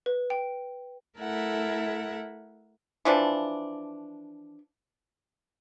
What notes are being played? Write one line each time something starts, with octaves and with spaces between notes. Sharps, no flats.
B4
G5
A3 E4 A4 A#4 E5 F#5
E3 F3 D4